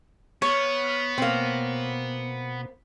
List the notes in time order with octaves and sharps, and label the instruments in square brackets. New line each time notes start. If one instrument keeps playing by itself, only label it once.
[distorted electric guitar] B3 [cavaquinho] C#5 [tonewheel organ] F6
[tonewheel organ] B2 [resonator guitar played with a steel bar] A#3 C4